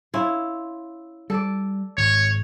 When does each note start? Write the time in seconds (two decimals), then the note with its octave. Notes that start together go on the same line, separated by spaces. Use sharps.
0.14 C#4 E4 F4
1.30 G3 A4 D5
1.97 G#1 C#5